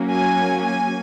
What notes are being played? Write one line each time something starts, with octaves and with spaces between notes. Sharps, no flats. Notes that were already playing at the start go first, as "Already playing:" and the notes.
Already playing: F#3 A#3 C#4
G#5
G#5